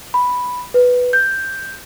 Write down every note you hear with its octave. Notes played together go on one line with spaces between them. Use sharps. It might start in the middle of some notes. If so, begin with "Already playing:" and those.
B5
B4
G6